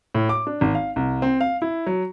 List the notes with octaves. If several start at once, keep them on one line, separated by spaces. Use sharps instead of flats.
A2
D6
D4
G#1
F5
C2
C4
F5
E4
F#3